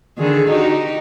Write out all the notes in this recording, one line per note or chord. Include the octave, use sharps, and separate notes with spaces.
D3 D#3 G#4
D#4 F#4 G4